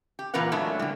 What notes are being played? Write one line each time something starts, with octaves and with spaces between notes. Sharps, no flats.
G4
A#2 E3 F4 A#4 B4 F#5
F#3 G#3 A3 D4 E4
D3 G3